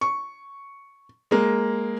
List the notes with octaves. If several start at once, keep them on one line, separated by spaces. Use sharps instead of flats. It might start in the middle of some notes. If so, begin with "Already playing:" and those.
C#6
G#3 A#3